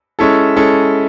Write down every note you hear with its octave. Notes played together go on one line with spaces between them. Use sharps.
G#3 C#4 E4 A4
G#3 C#4 E4 A4